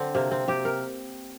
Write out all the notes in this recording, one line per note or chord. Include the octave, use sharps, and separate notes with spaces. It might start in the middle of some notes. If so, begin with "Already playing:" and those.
Already playing: D3 C4
C3 A#3
C4
C3 G4
A#4